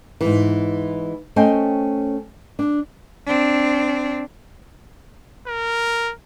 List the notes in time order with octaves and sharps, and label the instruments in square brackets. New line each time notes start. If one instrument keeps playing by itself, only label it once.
[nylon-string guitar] G#2 E3
A3 C#4 C5 D#5 G5 G#5
D4
[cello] C4 D4
[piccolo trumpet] A#4